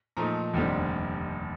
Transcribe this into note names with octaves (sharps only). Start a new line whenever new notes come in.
A#2 F3 A3 D#4 A#5
F1 D#2 D3 G3 C4